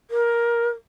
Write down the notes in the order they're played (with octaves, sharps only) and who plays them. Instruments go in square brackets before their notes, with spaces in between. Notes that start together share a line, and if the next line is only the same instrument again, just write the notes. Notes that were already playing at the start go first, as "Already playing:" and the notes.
[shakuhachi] A#4